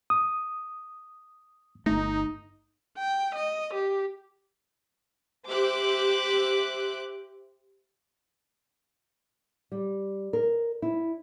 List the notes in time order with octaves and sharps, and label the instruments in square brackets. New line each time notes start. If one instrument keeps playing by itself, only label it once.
[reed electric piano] D#6
[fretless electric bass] G1 A3 [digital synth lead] D#4
[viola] G5
D#5
G4
[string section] G4 C5 E5 D6 F#6
[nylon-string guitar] G3
A#4
E4